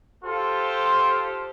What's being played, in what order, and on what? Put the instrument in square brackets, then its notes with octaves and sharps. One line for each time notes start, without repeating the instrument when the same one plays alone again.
[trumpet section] F4 G4 A4 C5